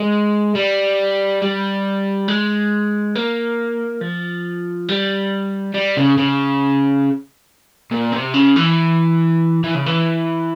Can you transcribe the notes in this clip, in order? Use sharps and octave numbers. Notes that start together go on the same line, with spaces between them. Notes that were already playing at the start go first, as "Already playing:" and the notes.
Already playing: G#3
G3
G3
G#3
A#3
F3
G3
G3
C#3
C#3
A#2
C3
C#3
E3
E3
C#3
E3